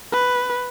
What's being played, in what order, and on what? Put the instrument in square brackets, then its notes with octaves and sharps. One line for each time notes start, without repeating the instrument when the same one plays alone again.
[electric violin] B4